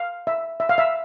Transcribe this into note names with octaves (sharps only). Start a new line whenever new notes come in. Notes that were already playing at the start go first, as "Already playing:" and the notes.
Already playing: F5
E5
E5
F5
E5